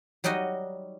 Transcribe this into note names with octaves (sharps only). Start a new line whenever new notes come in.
F#3 G3 D#4 F#4 D#5